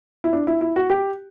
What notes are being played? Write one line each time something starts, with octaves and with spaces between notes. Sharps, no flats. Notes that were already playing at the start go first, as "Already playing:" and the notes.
E4
D4
E4
E4
F#4
G4